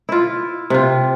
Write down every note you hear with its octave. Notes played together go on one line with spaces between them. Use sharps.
E4 F4
C3 F4